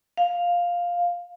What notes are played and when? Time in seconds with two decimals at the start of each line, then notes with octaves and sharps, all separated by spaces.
0.17 F5